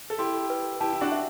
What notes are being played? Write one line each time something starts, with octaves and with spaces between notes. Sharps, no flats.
A4
E4 G4 C6
B4
E4 G4 A5
E4
D4 F#4
E5